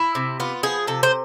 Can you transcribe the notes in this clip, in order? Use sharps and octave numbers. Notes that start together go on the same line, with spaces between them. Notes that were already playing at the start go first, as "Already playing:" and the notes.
Already playing: E4
C3
B3 F4
F3 G#4
C3 A4
C5